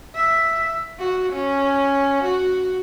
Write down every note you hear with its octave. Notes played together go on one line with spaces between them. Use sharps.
E5
F#4
C#4
F#4